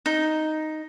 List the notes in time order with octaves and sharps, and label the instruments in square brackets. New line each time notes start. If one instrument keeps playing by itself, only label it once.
[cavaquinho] D#4